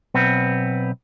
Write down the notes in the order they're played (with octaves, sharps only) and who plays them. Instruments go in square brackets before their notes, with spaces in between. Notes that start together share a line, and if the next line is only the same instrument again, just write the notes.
[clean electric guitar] B1 B3 C4